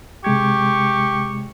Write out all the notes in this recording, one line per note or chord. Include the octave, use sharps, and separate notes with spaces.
C3 G#3 G4 C#6 G#6